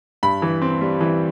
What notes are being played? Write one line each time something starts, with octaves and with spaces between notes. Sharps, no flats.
G2 B5
E3
C4
G3
E3